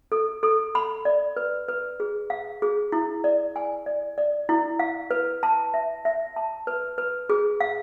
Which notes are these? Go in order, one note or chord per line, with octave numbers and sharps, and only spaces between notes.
A4
A4
B5
D5
B4
B4
G#4
F5
G#4
E4
D5
G#5
D5
D5
E4
F5
B4
A5
E5
E5
A5
B4
B4
G#4
F5